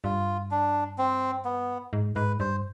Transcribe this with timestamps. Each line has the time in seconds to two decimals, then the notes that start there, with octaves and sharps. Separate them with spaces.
0.04 G2 F4
0.51 D4
0.98 C4
1.45 B3
1.93 G#2
2.16 G#2 B4
2.40 G2 C5